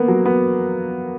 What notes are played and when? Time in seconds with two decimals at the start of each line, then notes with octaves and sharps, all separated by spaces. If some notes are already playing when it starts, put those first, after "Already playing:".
Already playing: A#3 B3
0.08 F#3
0.26 B3